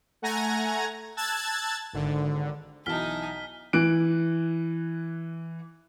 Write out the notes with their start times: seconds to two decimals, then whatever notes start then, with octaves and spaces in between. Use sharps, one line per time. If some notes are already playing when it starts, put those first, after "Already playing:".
0.22 A3 F#5 G#5 A#5 G#6 A#6
1.17 A5 E6 F#6 G#6 A6
1.93 G#1 D3
2.86 B1 E3 D#4 G#5 A5 F6 B6 G7
3.73 E3 F#6 D7